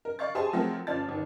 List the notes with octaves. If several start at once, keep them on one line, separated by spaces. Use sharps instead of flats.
A#4
D5 F5 C#6 A6
G4 G#4 C5 E5 G#5 A5
F3 F#3 A3 C4 A4 A#4
G1 C#4 F4 D5 A5 A6
G1 D#3